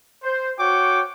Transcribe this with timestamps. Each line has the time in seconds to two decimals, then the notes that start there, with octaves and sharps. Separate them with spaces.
0.23 C5
0.59 F#4 C#5 G5 D6